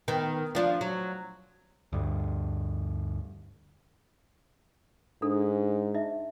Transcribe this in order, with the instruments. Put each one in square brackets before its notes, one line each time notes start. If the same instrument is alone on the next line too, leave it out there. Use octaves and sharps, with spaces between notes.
[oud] D#3 B3
F3 D4 F4
F#3
[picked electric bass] D2 G2
[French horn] G#2 [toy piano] D4 A4
[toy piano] D#4 D#5 E5